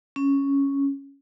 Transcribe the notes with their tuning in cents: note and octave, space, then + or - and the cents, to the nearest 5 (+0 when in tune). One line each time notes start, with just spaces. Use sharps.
C#4 +0